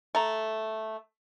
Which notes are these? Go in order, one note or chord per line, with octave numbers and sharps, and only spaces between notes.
A3 A#5